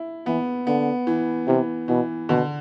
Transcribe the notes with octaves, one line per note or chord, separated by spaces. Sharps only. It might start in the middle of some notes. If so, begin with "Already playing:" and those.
Already playing: E4
E3 B3
D3 B3
E3
C3 E3
B2 E3
B2 D3